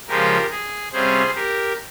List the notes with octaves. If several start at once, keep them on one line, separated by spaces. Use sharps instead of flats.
C#3 F3 G#3 C#4 F4 G4 A#4
G#4
C3 G3 C#4 F4 G#4 C5
G4 A#4